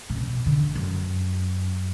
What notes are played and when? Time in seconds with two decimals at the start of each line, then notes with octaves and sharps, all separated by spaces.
0.10 A#2
0.17 B2
0.46 D3
0.75 F#2